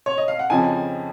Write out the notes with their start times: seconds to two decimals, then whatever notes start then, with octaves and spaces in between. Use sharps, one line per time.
0.06 C#5
0.18 D#5
0.28 F5
0.39 F#5
0.50 F2 C#3 F3 C4 D#4 G#5